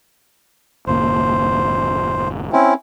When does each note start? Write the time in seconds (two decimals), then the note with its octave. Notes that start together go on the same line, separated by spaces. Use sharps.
0.87 F#1 D#2 A#2 C5
2.52 C4 C#4 E4